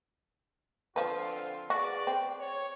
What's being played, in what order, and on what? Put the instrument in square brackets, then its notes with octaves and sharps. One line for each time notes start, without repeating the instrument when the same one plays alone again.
[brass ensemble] D3 C4 F4 [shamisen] F3 B4
[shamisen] F#4 [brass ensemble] G#4 B4 D5
[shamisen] C4
[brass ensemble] C#5